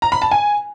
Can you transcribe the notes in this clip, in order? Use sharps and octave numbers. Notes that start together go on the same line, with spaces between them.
A#5
B5
A5
G#5